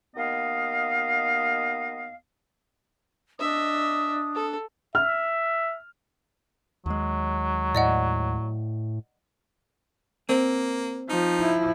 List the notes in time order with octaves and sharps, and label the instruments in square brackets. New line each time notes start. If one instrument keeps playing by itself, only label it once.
[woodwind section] D#2 B3 D#5 F5
[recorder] D4 [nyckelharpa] D#5 E5 [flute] D#6
[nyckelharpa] A4
[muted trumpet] E5 [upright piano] F6
[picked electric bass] D#2 G#3 [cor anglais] F#3
[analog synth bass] A2 [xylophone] D5 D#5 F#5
[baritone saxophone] A#3 [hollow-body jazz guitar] C4
[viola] F3 [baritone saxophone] D#4
[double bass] E4